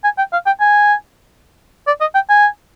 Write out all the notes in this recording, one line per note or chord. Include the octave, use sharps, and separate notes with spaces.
G#5
G5
F5
G5
G#5
D5
D#5
G5
G#5